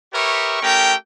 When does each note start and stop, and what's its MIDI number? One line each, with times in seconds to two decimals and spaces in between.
0.13 0.58 67
0.13 0.58 70
0.13 0.58 71
0.13 0.58 73
0.13 0.58 76
0.13 0.58 85
0.62 0.94 57
0.62 0.94 61
0.62 0.94 67
0.62 0.94 70
0.62 0.94 79